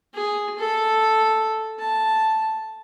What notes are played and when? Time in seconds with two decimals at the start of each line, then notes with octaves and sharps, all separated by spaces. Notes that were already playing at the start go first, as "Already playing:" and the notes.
0.14 G#4
0.59 A4
1.79 A5